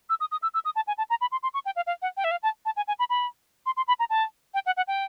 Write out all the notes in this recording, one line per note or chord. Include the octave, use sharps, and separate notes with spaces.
E6
D#6
D#6
E6
E6
D#6
A5
G#5
A5
A#5
B5
C6
C6
C#6
G5
F5
F5
F#5
G5
E5
F5
A5
A5
G#5
G#5
B5
B5
C6
C6
B5
A#5
A5
G5
F#5
F#5
G5